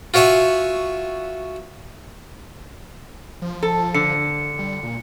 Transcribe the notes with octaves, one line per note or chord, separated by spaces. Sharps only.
F4 F#4 C#5 E5 G#5
F3
A4
D3 C#7
G3
A#2